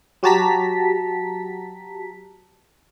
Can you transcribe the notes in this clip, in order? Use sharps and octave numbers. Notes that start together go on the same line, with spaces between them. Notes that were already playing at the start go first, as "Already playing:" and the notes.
F#3 F#4 G4 A5 A#5 B6